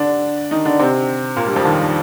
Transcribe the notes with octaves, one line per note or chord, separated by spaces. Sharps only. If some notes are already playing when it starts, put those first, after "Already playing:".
Already playing: D3 D4
D#3 D#4
D3 D4
C3 C4
A#2 A#3
G2 G3
F2 F3
D#2 D#3